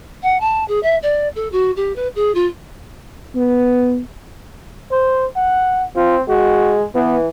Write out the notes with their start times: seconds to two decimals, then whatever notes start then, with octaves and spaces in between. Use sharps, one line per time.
0.23 F#5
0.40 A5
0.68 G#4
0.83 E5
1.02 D5
1.35 A4
1.52 F#4
1.76 G4
1.96 B4
2.15 G#4
2.34 F4
3.35 B3
4.92 C5
5.36 F#5
5.96 C4 F4
6.28 G#3 F#4
6.95 E3 B3